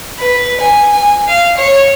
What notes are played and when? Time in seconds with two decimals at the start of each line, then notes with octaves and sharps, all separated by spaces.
0.18 B4
0.60 G#5
0.92 G#5
1.27 F5
1.57 C#5